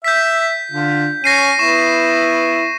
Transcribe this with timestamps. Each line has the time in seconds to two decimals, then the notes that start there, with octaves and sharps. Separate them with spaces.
0.04 E5 G6 B6
0.72 D3 F4
1.24 C#4 C#5 A#6 C7 D#7
1.59 B3 E4 C#6 E7